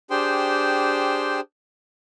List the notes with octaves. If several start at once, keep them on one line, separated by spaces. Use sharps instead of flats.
D4 G4 G#4 C5 G5 C6